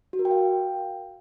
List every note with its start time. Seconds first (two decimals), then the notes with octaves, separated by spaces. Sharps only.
0.13 F#4
0.19 A#4
0.25 G5
0.31 F5